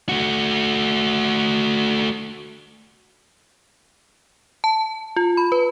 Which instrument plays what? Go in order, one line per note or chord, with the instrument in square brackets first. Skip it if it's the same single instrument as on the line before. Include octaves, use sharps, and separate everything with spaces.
[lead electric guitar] A3 F#4
[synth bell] A5
F4
B5
B4